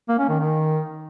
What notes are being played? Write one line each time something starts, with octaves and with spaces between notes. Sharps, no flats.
A#3
C#4
D#3
D#3